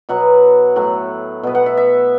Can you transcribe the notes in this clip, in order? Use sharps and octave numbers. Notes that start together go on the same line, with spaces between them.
B2 F#3 B3 F#5
A2 F#3 A3 F#5
B2 B3
F#5
E5
E5